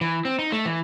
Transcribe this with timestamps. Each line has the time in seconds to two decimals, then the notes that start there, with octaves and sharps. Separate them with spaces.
0.01 E3
0.25 C4
0.39 D#4
0.52 A3
0.66 E3